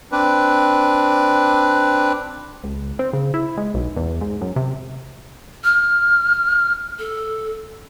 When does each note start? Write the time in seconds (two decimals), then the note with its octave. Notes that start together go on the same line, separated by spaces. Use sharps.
0.12 C4 D4 B4
2.64 C#2
2.99 C4
3.13 C#3
3.34 E4
3.57 G#3
3.74 B1
3.96 E2
4.21 G#2
4.41 F#2
4.56 C3
5.64 F6
6.99 A4